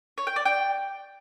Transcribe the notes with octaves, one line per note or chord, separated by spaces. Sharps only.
C#5
G5
D5
G5